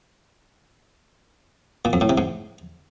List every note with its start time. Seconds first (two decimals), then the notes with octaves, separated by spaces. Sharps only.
1.85 A#2
1.93 F2
2.01 A2
2.09 C3
2.18 G#2